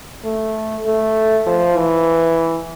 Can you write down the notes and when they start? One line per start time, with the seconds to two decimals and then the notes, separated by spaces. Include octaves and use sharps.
0.24 A3
0.86 A3
1.46 F3
1.77 E3